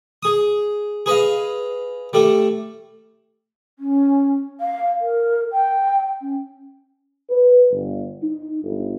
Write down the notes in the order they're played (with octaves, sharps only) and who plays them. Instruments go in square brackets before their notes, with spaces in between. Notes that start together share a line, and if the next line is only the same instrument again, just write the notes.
[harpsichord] G#4 D#6
G#4 B4 D#5 F5
G3 A3 A4
[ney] C#4
F5
A#4
G5
C#4
[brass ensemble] B4
G1
D#4
G1